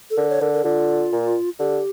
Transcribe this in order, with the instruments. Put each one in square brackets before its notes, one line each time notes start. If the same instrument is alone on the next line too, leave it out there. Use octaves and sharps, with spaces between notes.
[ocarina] A4
[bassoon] D3 [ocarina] A#4
[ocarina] C#5
[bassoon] D3 [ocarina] A#4
[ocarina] A#4
[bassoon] D3 [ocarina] F4
[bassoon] A#2
[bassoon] D3 [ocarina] G4